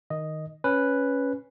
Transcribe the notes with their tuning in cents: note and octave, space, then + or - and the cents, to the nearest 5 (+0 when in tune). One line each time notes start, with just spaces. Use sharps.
D#3 +0 D#5 +0
C#4 +0 B4 +0